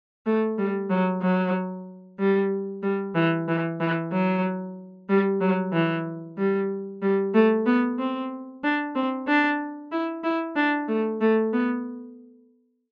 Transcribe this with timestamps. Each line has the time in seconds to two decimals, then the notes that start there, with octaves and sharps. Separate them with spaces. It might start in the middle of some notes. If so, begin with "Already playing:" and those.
0.26 A3
0.58 G3
0.90 F#3
1.22 F#3
2.19 G3
2.83 G3
3.15 E3
3.48 E3
3.80 E3
4.12 F#3
5.09 G3
5.41 F#3
5.73 E3
6.38 G3
7.02 G3
7.34 A3
7.66 B3
7.99 C4
8.63 D4
8.95 C4
9.27 D4
9.92 E4
10.24 E4
10.56 D4
10.88 A3
11.21 A3
11.53 B3